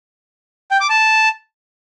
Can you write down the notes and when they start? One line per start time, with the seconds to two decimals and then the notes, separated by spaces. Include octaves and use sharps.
0.71 G5
0.80 D6
0.90 A5